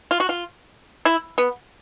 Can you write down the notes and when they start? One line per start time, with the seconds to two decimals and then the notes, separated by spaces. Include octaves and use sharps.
0.11 F4
0.20 F#4
0.29 F4
1.05 E4
1.38 B3